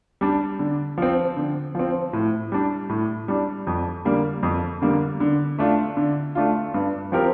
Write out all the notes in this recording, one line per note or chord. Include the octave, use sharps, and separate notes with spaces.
G3 D4
D3
F3 C4
D3
F3 C4
A2
G3 D4
A2
G3 D4
F2
D3 G3 A#3
F2
D3 G3 A#3
D3
A3 D4 F4
D3
A3 D4 F4
G2
F3 C4 G4 A#4